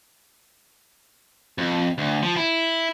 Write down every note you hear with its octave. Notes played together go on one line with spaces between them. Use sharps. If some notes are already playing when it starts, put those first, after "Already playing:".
F2
D2
F3
E4